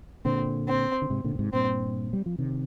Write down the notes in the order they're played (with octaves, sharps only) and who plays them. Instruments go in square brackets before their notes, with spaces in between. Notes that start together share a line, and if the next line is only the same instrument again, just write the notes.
[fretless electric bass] A#2 D3 [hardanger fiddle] C4
[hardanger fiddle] C4
[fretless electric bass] D3
G#2 C3
A#2 D3
A#2
G#2 C3
[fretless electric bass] G2 A#2 [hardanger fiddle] C4
[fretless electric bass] G3
F3
C3 D#3